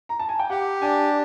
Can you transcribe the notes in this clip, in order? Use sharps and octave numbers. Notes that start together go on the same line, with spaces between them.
A#5
A5
G#5
G5
G4 F#5
D4 G#5